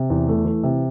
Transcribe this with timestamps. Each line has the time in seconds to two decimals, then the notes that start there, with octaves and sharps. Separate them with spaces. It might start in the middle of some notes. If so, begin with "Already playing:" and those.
Already playing: C3
0.10 E2
0.28 A3
0.45 E3
0.64 C3